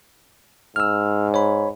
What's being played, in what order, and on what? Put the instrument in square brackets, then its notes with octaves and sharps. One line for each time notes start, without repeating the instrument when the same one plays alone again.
[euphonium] G#2 [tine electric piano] E6 F6
[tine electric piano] C#5 B5